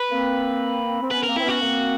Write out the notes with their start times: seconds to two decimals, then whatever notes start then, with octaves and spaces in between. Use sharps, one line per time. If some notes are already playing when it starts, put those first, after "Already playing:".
Already playing: B4
0.11 A#3 C4
1.02 C4
1.11 B3 C#4 B4
1.23 A#3 C4 A#4
1.36 C4 E4
1.43 B3 C#4 F#4
1.61 A#3 C4